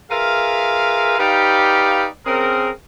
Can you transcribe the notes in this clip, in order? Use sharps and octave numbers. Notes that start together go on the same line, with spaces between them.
F4 G#4 A#4 B4 E5 F5
D#4 G4 B4 D5 F5
C#3 C4 G#4 A#4